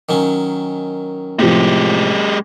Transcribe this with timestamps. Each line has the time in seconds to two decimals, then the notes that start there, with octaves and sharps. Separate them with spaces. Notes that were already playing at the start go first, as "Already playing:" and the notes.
0.09 D#3 F#3 C#4
1.39 A2 C3 F3 G#3 G4